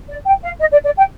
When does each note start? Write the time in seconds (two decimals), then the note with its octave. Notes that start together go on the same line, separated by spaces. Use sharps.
0.09 D5
0.26 G5
0.43 F5
0.59 D#5
0.72 D5
0.84 D5
0.97 G5